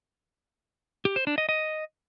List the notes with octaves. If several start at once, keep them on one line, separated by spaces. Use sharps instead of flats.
G4
C5
D4
D#5
D#5